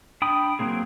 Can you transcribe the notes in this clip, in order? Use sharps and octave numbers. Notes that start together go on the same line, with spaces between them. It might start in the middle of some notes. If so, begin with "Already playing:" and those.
D4 G5 B5 D#6
F#3 A#3 C4 G#4